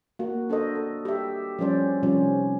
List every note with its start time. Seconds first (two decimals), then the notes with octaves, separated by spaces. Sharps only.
0.19 A#3 F#4
0.50 D4 A4 C5 D#5
0.76 A4
1.05 G4 E5
1.59 F3 G3 C#4 C5 D5
2.03 C3 D#3 F3 G3 C#4